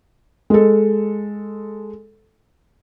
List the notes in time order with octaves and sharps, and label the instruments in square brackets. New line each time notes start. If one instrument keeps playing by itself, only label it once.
[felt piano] G#3 A4